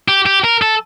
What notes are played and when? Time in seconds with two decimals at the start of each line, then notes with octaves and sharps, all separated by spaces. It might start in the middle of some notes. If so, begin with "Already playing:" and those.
0.08 G4
0.26 G4
0.44 A#4
0.62 A4